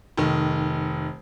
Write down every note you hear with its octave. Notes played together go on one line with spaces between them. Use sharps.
F1 D#3